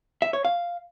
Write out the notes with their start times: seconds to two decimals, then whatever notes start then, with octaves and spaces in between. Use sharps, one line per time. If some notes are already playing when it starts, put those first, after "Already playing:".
0.22 E5
0.33 C#5
0.45 F5